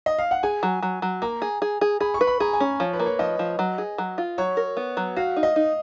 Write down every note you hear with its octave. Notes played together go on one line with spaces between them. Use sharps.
D#5
F5
F#5
G#4 G#5
F#3
F#3
F#3
A#3 A#5
G#4
G#4
G#4
G#4 B5
C#6
B4
B5
G#4 A#5
G#5
C#4
F3 C#5
B4
A#3
C#5
F3 D#5
F3
F#3
G#4
F#3
F4
F#3 C#5
A#4
B3
F#3
F#4 F5
D#4
D#5
D#4